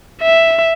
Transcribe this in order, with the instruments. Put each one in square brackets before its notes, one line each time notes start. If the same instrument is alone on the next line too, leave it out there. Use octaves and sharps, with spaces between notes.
[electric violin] E5